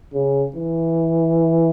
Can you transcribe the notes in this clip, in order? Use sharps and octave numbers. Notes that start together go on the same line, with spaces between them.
C#3
E3